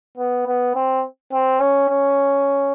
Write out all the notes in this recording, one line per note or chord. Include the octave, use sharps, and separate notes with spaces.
B3
B3
C4
C4
C#4
C#4